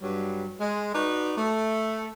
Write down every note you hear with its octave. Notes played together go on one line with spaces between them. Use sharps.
G2 F#3 G3
G#3
D#4 F#4 B4 D5
A3